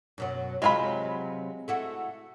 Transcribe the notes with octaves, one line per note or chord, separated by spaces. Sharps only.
F#2 B2 F#3
C3 F#3 G#3 F4 B5
A3 E4 F#4